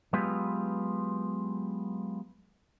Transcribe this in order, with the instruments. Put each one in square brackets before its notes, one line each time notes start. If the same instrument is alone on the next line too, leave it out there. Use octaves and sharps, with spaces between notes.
[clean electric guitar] F#3 G#3 B3 F4 G4 B4